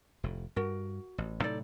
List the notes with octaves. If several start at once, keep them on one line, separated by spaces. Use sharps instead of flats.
F1 A2
G2 F#4 A#4
A1
A2 C3 F#3 D#4 A4 D5